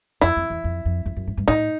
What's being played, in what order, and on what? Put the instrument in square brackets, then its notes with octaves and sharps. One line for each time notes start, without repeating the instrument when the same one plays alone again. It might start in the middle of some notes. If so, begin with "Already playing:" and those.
[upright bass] F2 [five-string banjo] E4
[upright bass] F2
E2
F2
F2
F2
F#2
G#2
G2
[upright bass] A2 [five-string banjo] D#4